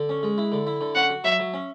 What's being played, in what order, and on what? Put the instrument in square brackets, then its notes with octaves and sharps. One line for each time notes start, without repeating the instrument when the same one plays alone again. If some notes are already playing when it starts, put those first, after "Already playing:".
Already playing: [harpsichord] D3
C#4
G#3
E4
D3
E4
D3
[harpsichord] C#4 [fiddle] F#5
[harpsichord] F#4
[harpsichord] F#3 [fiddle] E5
[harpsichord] F#3
C#4